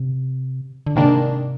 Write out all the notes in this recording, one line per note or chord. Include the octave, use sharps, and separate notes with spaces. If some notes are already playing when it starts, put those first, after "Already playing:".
Already playing: C3
D3
G#2 C3 D#3 A#3 D4